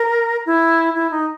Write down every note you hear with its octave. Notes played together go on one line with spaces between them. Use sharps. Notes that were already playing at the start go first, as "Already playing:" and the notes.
Already playing: A#4
E4
E4
D#4